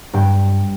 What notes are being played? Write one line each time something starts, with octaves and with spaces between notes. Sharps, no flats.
G2 G5